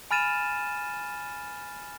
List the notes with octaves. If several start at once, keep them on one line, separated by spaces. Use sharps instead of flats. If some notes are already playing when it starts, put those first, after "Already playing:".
G#5 B5 F6 A6 D#7 E7